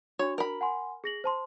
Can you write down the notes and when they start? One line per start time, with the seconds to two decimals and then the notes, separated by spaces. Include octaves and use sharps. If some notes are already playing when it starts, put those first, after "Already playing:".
0.19 D4 F#4 C#5
0.38 A#4 B5
0.61 F#5 G#5 C6
1.04 G#4 A#6 F#7
1.24 C5 A5 C6